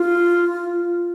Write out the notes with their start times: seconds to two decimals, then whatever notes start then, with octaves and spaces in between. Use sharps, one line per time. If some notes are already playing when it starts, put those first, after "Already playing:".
Already playing: F4